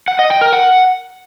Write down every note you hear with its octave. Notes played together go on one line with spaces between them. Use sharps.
F#5
D#5
G5
A#4
F#5